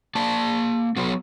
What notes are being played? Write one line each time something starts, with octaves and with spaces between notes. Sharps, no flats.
A#3 D5 A5
F#3 B3